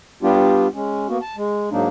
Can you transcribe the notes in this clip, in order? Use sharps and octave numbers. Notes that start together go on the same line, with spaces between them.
G3 B3 D4 F4 G4
G#3 C#4
A#3 B3 F#4
A5
G#3
G#2 F#3 A#3 D4 D#4